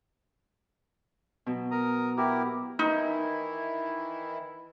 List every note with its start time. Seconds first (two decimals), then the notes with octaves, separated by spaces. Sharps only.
1.46 B2 F#3
1.71 A#4 A#5 D#6
2.17 E4 F#4 G4 A#4
2.79 D#3 E3 D#4 E4